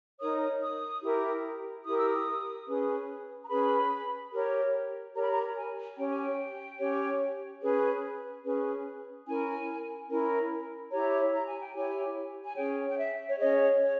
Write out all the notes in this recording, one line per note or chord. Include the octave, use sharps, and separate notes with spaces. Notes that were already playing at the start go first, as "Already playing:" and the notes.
D#4 A#4 C#5 D#6
D#6
E4 G4 A#4
E4 G4 A#4 D#6
E6
D#6
C#4 G#4 B4
A#5
C#4 G#4 B4 B5
G4 A#4 C#5
G4 A#4 C#5 A#5
B5
A#5
G#5
C#4 G4 C#5 G5
G#5
G5
C#4 G4 C#5
C#4 G#4 B4
C#4 G#4 B4
C#4 E4 A#4 G#5
C#4 E4 A#4
E4 G4 C#5 A#5
A#5
G#5
G5
E4 G4 C#5 G#5
G#5
C#4 G#4 C#5 G5
G5
E5
C#5
C#4 G#4 C#5 D#5
C#5